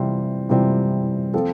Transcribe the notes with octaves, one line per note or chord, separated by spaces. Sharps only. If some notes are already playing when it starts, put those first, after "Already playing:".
Already playing: C3 E3 G3 C4 F4
C3 E3 G3 C4 F4
F3 C4 F4 A4